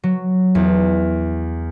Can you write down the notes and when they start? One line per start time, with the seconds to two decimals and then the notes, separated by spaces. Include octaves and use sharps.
0.03 F#3
0.55 E2